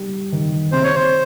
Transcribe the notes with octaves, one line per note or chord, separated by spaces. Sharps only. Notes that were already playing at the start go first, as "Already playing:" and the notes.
Already playing: G3
D#3
C3 C5
C#5
C5